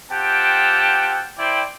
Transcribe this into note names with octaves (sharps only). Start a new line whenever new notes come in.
C4 F4 G4 F#5 G5 A5
E4 C5 D5 G5